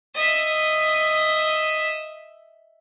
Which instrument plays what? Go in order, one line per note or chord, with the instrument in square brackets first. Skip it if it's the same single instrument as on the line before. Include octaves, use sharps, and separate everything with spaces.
[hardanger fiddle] D#5 E5